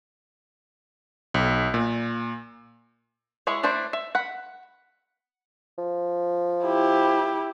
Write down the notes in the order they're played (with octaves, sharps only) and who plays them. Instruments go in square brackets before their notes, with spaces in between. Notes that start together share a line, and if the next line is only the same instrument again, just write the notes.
[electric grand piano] B1
A#2
[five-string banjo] G#3 E4 G#4 C#5
A3 D4 E4 C5 D5
E5
F#5 B5
[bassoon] F3
[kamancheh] E4 G4